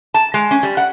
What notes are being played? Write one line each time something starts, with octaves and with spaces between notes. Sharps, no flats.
A5
G#3
C#4
G3
F#5